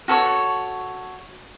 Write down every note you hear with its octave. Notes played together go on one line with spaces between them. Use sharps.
F#4 A4 C#5